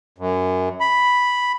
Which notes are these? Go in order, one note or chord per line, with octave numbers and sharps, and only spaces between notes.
F#2
B5